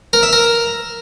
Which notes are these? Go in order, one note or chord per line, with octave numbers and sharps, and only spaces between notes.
A#4
E5
A#4